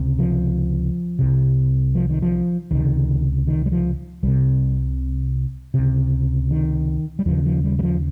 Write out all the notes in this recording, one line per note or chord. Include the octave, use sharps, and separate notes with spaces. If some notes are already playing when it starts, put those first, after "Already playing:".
Already playing: C#2 C3
F3
C2 C3
F3
D#3
F3
C#2 C3 D#3
D#3
G3
F3
C2 C3 G3
C#2 C3
D#3
G3
D#2 C#3 F3
F3
G3
G3
F3